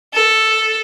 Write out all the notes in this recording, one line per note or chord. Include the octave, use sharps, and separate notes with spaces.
A4